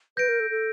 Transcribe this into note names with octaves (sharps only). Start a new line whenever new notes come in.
B4 G6 A#6 D7
A#4
A4
A4